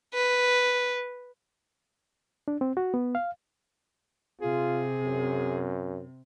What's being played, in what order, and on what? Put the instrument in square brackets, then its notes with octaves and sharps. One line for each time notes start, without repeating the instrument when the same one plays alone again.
[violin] B4
[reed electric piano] D4
C4
F#4
B3
F5
[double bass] C3 [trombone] F4 [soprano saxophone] G#4
[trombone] F#2